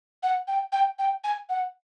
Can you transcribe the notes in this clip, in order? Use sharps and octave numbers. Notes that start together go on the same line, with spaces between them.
F#5
G5
G5
G5
G#5
F#5